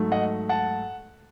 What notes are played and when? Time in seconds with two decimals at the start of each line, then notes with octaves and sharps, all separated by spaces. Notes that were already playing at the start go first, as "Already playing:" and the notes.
Already playing: G#2 F#3 A3
0.12 D#5 F#5
0.49 F#5 A5